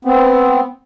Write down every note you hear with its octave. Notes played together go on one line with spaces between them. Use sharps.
B3 C4